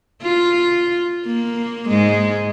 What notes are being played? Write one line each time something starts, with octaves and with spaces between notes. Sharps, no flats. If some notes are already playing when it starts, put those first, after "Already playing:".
F4
A#3
G#2 G#3